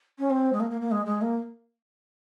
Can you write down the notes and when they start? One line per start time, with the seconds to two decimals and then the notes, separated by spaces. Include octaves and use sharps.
0.19 C#4
0.30 C4
0.53 G#3
0.60 A#3
0.70 A#3
0.81 A#3
0.91 G#3
1.06 G#3
1.21 A#3